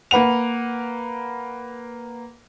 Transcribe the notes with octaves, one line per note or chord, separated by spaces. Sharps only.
A#3 B4 F#5 F7